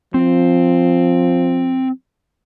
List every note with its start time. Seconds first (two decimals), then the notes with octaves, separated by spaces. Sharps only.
0.14 F3 C4